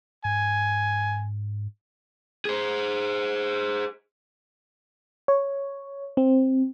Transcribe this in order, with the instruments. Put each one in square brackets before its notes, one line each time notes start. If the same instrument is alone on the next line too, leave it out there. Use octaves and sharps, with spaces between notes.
[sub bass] G#2 [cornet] G#5
[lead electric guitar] G#4 C5
[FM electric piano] C#5
C4